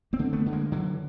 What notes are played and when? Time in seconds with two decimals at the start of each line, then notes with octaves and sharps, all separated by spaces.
0.13 A#3 C4
0.19 D3
0.33 A3 B3
0.46 D3
0.53 G#3 A#3
0.72 D3 E3 F#3